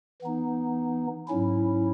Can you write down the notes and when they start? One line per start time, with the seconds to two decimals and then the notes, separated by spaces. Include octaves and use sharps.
0.22 E3 B3 D#4
1.28 G#2 F#3 C#4 E4